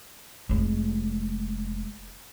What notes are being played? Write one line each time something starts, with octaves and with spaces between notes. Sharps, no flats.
F1 G#3